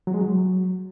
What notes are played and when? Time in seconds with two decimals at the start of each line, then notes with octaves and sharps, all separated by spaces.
0.07 F#3
0.14 G#3
0.21 F#3